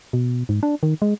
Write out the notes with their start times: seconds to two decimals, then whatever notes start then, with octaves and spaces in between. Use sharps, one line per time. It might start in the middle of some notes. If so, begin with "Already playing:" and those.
0.13 B2
0.49 G#2
0.63 D4
0.83 D#3
1.02 G#3